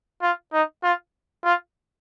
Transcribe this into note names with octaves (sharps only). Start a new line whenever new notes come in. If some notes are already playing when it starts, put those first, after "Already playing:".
F4
D#4
F4
F4